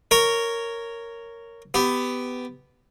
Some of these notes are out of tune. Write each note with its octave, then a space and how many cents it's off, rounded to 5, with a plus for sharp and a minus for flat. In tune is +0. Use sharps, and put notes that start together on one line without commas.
A#4 -10 C#5 +5
B3 +15 G4 +0